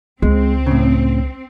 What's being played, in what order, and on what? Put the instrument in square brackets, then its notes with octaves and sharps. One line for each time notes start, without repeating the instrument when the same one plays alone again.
[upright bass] C#2 [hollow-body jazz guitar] G#3 [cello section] C4
[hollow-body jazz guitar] A2 C#3